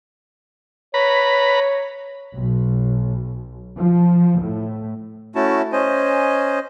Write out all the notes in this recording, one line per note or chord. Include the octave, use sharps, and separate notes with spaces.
B4 C#5 A#5 B5
B1
F3
A2
A3 C#4 E4 F#4 A5
C#4 C5 D#5 G#5